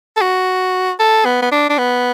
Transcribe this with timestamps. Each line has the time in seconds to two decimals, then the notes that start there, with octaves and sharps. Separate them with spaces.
0.17 A4
0.21 F#4
1.00 A4
1.25 B3
1.42 B3
1.52 D4
1.70 D4
1.78 B3